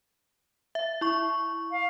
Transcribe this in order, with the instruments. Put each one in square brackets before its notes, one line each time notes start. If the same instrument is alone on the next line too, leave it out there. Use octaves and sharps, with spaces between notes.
[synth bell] E5
E4 C#6
[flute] F5